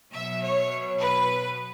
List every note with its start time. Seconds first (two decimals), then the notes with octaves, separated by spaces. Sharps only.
0.12 B2 F#3 E5
0.42 C#5
1.00 B4